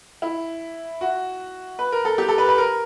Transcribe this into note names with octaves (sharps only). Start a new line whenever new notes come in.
E4
F#4
B4
A#4
A4
G4
A4
B4
B4
A#4